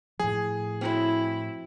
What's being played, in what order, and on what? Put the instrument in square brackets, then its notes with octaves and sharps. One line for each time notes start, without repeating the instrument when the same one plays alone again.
[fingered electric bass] A2 F3 [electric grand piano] G#4
[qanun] C4 F#4 C#5 [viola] E4